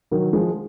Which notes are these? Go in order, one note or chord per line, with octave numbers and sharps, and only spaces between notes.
D#3 F#3
F3 G#3